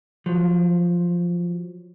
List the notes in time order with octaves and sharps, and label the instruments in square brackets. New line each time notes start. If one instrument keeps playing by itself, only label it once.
[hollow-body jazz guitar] F3 F#3